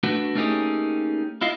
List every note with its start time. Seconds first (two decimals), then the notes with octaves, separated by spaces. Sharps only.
0.03 A3 D4 F#4 B4
0.35 A3 A#3 C#4 D#4 G4 G#4
1.41 E4 F4 D#5 F5